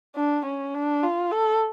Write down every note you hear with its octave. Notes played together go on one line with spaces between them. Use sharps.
D4
C#4
D4
F4
A4